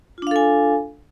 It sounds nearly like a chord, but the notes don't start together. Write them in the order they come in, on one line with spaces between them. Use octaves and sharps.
F4 D4 F5 A4 G#5